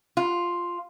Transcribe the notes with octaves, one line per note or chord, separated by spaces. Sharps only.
F4